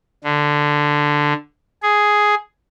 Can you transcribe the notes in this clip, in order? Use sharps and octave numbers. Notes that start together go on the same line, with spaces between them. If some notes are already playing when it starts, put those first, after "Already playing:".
D3
G#4